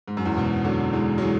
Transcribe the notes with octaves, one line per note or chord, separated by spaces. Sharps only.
G#2
F#2
E2 G#2
G#2 B2
D3 F#3
E3 G#3
F#3
E3 G#3